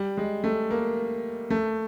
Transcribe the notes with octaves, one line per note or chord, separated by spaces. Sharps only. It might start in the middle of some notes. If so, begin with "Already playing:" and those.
Already playing: G3
G#3
A3
A#3
A3